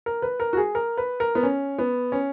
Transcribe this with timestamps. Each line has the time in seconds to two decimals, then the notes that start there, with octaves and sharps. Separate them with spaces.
0.06 A#4
0.22 B4
0.40 A#4
0.53 F#4
0.57 G#4
0.75 A#4
0.98 B4
1.20 A#4
1.35 B3
1.43 C#4
1.79 B3
2.12 C#4